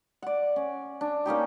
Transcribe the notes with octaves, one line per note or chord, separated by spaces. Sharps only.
D5 F#5
C#4
D4
A#3 C#4 D#4 G4